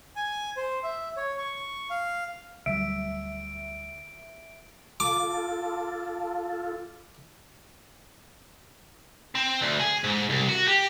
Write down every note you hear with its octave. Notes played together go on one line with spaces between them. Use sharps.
G#5
C5
E5
C#5
C#6
F5
D2 F#3 G3 E5 D7
F4 A4 D6
C4
D2
G#4
G#2
C2
F#4
G4